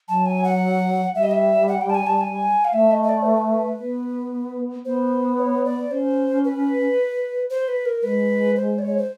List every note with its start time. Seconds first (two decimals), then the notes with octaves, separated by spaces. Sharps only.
0.08 F#3 A5
0.26 G#5
0.44 F#5
1.15 G3 E5
1.23 D#5
1.31 E5
1.68 F#5
1.81 G5
1.90 A5
1.94 G#5
2.07 A5
2.21 G#5
2.65 F5
2.73 A3 E5
2.91 D#5
3.03 D#5
3.09 D5
3.22 C5
3.26 B4
3.80 B3
4.85 B3 C5
5.38 C#5
5.65 D5
5.91 C#4 C5
6.45 B4
7.50 C5
7.68 B4
7.85 A#4
8.03 G#3 B4
8.56 C5
8.79 D5
8.82 C#5
8.98 C5